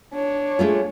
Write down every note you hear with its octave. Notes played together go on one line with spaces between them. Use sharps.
D4 C#5
G#3 A3 F4